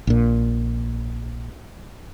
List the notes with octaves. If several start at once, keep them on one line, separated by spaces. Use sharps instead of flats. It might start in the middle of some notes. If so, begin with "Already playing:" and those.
A#1 A#2